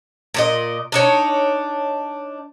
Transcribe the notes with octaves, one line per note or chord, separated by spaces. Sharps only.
A#2 D5 D#5
D4 D#4 C#5